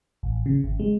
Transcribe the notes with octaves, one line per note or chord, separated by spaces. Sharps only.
A1
C#3
G#1
G#3